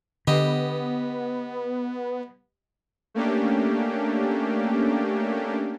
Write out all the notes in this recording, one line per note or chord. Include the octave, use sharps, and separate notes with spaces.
D3 B3 G4 D#5
A3 A#3 C#4 D4 G4